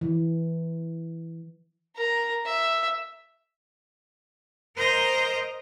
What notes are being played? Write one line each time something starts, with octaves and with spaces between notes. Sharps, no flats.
E3
A#4 A#5
E5
A#4 C5 D#5 A#5 G6 A#6